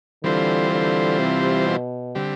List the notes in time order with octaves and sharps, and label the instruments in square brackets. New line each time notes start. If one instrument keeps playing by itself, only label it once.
[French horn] D3 [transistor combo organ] E3 G3 C4 F4 C5
[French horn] D3
C3
B2
[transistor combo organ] D3 G3 C4 G4